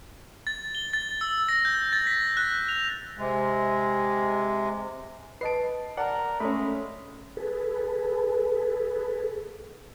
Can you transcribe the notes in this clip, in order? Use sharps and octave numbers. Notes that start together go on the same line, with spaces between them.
A6
G7
A6
E6
A#6
G6
A6
B6
F#6
F7
C3 G#3
B4 D#5 A5 C7 D7
A#4 D5 F#5 A5
G#3 A3 C#4 B5
G#4 A4 B4